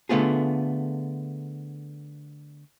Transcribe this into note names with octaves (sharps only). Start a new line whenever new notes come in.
D3 A3 B3 F4 G#4